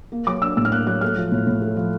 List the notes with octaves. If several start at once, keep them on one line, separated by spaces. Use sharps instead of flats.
A#3
F#3 D6
D4 E6
A2 E6
F6
A#3 F#6
F#3 F#6
A3 F6
F3
A2
A2
A3
F3